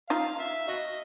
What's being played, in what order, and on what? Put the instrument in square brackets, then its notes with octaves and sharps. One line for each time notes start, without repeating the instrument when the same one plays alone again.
[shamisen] D#4 F4 [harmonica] F5
[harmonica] E5
F#4 D#5